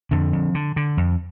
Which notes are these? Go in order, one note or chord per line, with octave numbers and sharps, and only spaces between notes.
F2 D3
F2
D3
D3
F2